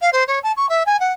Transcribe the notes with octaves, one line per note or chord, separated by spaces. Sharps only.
F5
C5
C#5
A5
C#6
E5
G#5
F#5